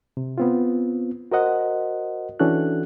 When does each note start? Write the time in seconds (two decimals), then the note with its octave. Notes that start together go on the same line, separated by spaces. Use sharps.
0.17 C3
0.38 B3 C4 F4
1.32 F#4 A#4 C5 D#5 F#5
2.40 E3 C#4 D4 F#4 A4 F#6